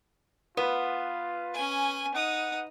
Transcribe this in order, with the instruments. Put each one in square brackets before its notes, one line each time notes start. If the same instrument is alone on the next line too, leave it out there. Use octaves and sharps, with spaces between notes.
[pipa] B3 [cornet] F4 [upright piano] B4
[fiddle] C#4 G#5
[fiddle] D#4 D#6 [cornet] F#5